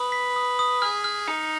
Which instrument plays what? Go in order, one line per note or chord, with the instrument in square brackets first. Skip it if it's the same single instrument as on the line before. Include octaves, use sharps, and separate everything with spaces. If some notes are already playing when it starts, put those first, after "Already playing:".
Already playing: [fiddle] B4 [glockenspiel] D#6
[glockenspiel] B6
D#6
D#6
[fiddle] G#4 [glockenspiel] F6
[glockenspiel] F6
[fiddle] D#4 [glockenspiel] C#7